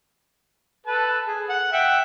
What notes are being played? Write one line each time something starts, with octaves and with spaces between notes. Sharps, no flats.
A4 B4 A5
G#4
F#5
E5 F#5 G5